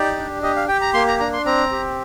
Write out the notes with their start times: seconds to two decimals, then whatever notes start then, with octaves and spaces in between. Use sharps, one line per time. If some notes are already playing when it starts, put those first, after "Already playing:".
Already playing: D#4 G4 D5
0.18 D4
0.43 G4 D#5
0.56 F5
0.68 G4 G5
0.81 A#5
0.94 A#3 C6
1.08 A#5
1.19 D4 A#5
1.33 C6
1.46 C4 A#5
1.71 G4